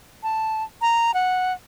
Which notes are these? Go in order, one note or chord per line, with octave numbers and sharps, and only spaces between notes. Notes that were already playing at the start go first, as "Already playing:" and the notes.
A5
A#5
F#5